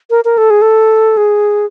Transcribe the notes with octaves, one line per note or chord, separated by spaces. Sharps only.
A#4
A#4
A4
G#4
A4
G#4